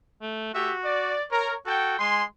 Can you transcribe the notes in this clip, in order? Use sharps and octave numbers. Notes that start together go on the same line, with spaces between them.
A3
A3 F#4 G4 E5
D5
A#4 C#5
F#4 A4 G5
G#3 G#5 C6